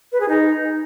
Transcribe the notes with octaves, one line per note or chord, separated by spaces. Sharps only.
B4
G#4
D#4